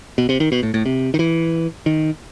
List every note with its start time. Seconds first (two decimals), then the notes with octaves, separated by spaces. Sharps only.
0.18 B2
0.29 C3
0.40 D#3
0.52 B2
0.63 A2
0.74 A2
0.86 C3
1.14 D#3
1.19 E3
1.86 D#3